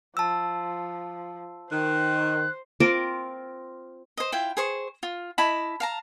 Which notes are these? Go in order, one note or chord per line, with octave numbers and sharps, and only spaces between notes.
F3 A5 E6
D#3 C5 F#6
C4 F4 A#4 D6
C5 D#5
E4 F4 G5
G#4 C5 C#6
F4
E4 D#5 A5 B5
F5 A5 A#5